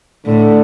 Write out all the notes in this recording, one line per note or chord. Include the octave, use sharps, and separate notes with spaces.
A2 D3